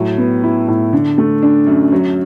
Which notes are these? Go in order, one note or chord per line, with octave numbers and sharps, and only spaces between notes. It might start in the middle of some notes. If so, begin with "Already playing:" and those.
Already playing: A2 F#3
B3
E4
A2
D3
A3
D4
F#2
F#3